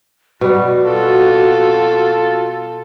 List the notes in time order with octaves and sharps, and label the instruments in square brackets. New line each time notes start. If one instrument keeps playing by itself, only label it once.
[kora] B2 G3 [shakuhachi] F#4
[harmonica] F4 A4